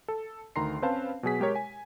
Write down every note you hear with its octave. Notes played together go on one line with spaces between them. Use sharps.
A4
D2 D#3 A#5 C6 C7
C4 C#4 B4 C5 F5 A5
B2 F#3 G#4 B6
G#3 G4 A#4 C#5
G#5